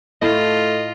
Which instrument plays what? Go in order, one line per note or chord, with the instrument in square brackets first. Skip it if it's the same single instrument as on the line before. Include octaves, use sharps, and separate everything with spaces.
[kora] A2 [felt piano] A3 [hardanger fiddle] F4 [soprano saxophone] D#5